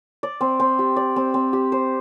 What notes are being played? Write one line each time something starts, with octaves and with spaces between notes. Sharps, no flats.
D5
C4
C4
G4
D5
C4
C4
G4
C5